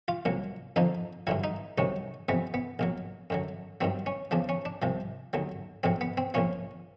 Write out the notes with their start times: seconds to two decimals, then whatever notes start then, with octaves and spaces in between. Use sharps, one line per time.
0.08 F4
0.25 C2 A#2 F#3
0.76 F2 D3 F3 D#4
1.27 G2 D3 F#3 E4
1.44 D#4
1.78 C2 C3 D#3 F#3 C#4
2.29 F2 C3 E3 B3
2.54 B3
2.79 A#1 A#2 F#3
3.30 F#2 D3 F#3
3.81 G2 D#3 F#3 C4
4.06 C#4
4.31 E2 C#3 F3 D4
4.49 C#4
4.65 D4
4.82 C2 C3 F3
5.33 D#2 D3 F#3
5.83 A#1 A2 F#3 C4
6.01 B3
6.17 C4
6.34 A#1 A#2 F3 C#4